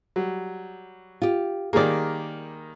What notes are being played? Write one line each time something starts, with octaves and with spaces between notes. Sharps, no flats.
F#3 G3
F4 G4
D#3 G3 A#3 G#4 D5